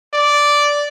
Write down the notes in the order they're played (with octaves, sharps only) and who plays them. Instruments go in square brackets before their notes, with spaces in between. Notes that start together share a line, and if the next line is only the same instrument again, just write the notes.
[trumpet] D5